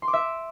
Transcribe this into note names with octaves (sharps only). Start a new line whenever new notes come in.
C6
D6
E5